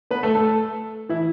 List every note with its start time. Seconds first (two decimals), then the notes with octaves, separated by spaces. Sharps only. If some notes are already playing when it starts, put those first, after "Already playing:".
0.11 B3 B4
0.23 A3 A4
0.35 A3 A4
1.09 E3 E4